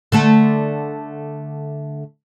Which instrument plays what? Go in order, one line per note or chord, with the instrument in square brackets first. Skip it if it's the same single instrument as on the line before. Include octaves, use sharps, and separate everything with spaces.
[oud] D3 A3 A4